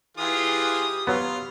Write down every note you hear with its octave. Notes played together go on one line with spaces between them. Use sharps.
E3 F4 G4 G#4 D#6
F#3 B3 F4